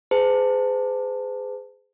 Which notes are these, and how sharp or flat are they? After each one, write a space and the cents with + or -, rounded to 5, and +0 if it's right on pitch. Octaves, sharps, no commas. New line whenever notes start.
G#4 +0 C5 -45 A5 +20